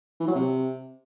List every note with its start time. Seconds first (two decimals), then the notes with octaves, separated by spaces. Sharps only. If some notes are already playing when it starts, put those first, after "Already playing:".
0.20 E3
0.28 F#3
0.35 C3